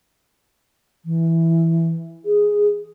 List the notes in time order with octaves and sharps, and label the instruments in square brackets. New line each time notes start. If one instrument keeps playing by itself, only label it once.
[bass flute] E3
G#4